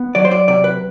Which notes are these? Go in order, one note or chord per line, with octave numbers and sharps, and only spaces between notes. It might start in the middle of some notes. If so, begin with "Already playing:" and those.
Already playing: B3
F#3 D5
C5
D5
C3 D5
B4